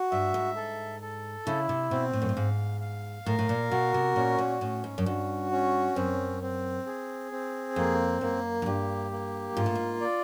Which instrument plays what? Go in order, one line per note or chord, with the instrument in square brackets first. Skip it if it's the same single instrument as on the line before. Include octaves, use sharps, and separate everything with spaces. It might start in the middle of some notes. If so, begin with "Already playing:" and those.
Already playing: [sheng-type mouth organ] F#4
[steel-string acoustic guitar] G2 [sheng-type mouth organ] E5
[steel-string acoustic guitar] G#2
[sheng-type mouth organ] A4
A4
[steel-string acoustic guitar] C#3 [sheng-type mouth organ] E4
[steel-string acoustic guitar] C3
[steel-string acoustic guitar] B2 [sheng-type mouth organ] C4
[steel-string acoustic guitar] A2
F#2
G2
[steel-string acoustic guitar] G#2 [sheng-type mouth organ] F5
[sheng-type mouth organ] F5
[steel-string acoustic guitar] A2 [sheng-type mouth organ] A#4
[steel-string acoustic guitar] A2
A#2
[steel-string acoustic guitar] B2 [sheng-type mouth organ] F#4
[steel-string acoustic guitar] C3
[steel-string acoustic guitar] A#2 [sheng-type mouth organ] C#4
[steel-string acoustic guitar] A#2
[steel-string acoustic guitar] A2 [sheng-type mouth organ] C#4
[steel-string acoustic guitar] G#2
F#2
[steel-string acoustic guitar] G2 [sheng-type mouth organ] F#4
[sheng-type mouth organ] C#4
[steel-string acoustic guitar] F#2 [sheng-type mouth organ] C4
[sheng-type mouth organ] C4
G#4
C4
[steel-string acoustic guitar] F2 [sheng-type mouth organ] A#3
[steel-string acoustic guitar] F#2 [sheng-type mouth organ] A#3
[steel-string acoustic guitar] F#2
[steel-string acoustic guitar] G2 [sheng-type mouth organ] G4
[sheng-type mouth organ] A#3
[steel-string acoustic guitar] G#2 [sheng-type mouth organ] F4
[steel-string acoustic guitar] A2
G#2
[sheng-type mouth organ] D5